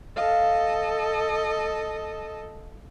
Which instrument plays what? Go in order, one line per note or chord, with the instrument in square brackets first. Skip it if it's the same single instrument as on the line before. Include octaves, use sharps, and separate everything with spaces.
[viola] A4 D#5 [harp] F5